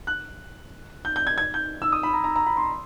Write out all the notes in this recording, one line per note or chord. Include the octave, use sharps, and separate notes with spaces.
F#6
G6
G6
G#6
G#6
G6
E6
D#6
B5
A#5
A#5
A#5
B5
C6